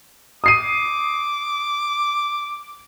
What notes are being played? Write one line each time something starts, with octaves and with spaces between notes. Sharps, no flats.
D6 D#6 C7 D#7